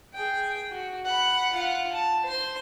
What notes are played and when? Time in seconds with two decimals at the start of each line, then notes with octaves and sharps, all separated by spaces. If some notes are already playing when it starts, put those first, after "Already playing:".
0.14 G#4 G5
0.71 F#4
1.05 F#5 B5
1.53 F4 F#5
1.93 A5
2.24 C5 C6